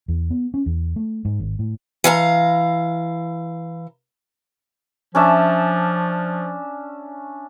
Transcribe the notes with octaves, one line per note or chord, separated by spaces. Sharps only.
E2
B3
C#4
E2
A3
G#2
G#1
A2
E3 F5 G#5 A#5
F3 C#4 D4 E5